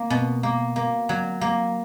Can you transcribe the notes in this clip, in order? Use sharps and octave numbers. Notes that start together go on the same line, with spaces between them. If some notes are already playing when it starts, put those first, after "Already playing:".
Already playing: A#3
B2
A#3
A#3
F#3
A#3